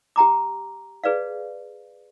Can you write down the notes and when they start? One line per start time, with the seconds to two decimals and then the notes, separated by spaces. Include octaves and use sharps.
0.16 G4 G5 A#5 D6
1.04 G#4 B4 D5 F5